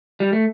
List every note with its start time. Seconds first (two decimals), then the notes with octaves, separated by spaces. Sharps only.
0.20 G3
0.33 A3